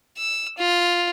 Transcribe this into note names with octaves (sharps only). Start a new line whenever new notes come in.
E6
F4